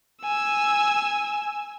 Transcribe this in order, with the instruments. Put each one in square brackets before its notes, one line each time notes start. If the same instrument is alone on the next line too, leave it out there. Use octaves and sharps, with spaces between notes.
[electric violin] G#5 E6